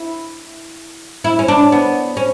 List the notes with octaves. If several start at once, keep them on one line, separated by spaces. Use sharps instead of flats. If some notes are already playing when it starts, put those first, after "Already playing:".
Already playing: E4
E4
C#4
D4
B3
C#4